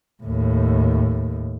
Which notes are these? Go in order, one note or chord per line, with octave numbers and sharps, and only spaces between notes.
D#2 A2